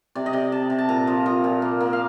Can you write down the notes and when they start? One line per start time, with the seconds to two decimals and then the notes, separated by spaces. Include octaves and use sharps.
0.15 C3 D5
0.26 D#5
0.33 C3 D5
0.52 C3 A5
0.70 C3
0.78 A5
0.89 A#2 A#5
1.07 F3
1.26 F3 A#5
1.44 A#2
1.62 A#3
1.80 A#3
1.93 F5